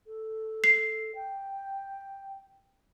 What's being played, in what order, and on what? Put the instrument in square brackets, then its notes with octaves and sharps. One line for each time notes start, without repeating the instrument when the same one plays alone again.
[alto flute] A4
[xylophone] C7
[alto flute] G5